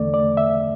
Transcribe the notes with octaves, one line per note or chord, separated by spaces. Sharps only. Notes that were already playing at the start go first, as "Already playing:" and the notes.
Already playing: E2 D3 A3 D5
D5
E5